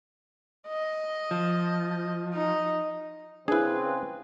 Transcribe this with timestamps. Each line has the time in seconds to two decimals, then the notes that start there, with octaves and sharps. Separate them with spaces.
0.68 D#5
1.31 F3
2.34 D#4
3.48 C#3 C4 D4 E4 G#4 B4